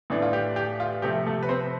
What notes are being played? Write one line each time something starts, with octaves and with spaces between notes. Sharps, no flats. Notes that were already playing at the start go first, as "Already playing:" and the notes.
A2 E3 A3 D4
F4
G4
G4
F4
C3 F3 A3 G4
A3 A4
B4
C4 C5